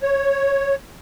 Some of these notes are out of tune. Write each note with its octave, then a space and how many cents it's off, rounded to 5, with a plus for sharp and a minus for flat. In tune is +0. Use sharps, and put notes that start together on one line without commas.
C#5 -5